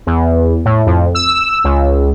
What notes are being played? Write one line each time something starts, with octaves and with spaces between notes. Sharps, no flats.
E2
A2
F2
E6
C#2